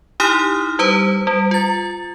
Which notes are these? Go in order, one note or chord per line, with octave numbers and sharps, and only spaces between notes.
D#4 E4 G4 D#6 F6
G3 B4 C5
G3
F4 A6